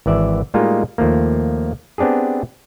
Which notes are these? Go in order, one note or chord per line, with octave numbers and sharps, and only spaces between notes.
G#1 E3 D5 E5
A2 G3 G#3 A#3 D#4 F4
D#2 F3 A3 A#3
B3 C4 D4 G4 G#4